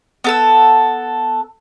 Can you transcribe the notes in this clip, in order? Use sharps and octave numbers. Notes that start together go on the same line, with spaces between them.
B3 A4 E6